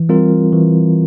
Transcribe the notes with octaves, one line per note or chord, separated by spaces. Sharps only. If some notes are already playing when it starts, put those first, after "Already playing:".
Already playing: E3
G3 C4 F4 A#4
E3